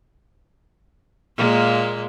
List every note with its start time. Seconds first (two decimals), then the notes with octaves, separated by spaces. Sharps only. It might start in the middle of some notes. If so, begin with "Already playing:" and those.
1.37 A#2 G#3 A#3